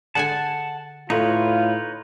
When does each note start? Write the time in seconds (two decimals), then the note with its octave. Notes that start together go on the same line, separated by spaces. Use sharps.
0.15 D3 G#4 F#5 G#5 A5
1.10 A2 A3 D#4 F4 B4 C#5